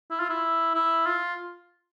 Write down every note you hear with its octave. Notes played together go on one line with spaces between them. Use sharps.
E4
F4
E4
E4
F4